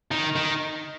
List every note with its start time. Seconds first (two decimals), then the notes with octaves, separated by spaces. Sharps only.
0.11 D#3
0.36 D#3